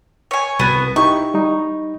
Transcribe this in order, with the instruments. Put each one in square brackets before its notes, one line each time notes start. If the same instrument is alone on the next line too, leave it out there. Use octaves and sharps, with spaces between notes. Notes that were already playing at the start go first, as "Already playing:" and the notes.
[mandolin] C#5 G#5
[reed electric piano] C2 [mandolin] B3 F#4
[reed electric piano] D#4 E4 G4 [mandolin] C#6
[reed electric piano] G3 D#4